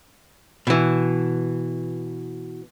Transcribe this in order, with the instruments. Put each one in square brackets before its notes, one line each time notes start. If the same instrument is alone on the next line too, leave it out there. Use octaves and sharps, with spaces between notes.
[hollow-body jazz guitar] B2 E3